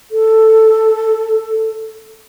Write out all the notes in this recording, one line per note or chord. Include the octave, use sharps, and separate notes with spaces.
A4